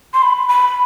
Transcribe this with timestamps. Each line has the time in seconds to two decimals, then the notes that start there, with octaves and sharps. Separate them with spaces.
0.14 C6
0.22 B5
0.49 B5